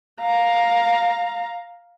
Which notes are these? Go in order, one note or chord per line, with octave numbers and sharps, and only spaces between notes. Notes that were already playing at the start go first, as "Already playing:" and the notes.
F5 A#5